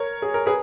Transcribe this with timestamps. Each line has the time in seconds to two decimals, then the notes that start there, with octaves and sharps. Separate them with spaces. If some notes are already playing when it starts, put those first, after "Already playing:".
Already playing: A#4 C#5
0.22 G#4
0.34 A#4
0.46 G#4 B4